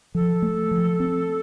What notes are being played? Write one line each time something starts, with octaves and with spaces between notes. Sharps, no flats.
F3 A4
A3
F3
C4